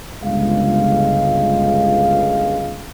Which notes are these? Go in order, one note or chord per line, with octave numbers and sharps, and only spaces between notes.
G1 C#2 G#3 F5